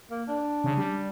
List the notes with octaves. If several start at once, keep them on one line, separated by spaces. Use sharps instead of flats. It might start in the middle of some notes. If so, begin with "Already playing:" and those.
A#3
D4
C#3
G3